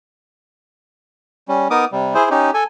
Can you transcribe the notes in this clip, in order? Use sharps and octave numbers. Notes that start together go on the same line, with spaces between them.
G3 C#4
B3 D#4 A#4 D6 D#6
C3 G3
E4 G#4 C5
C#4 D#4 G4
A4 G#5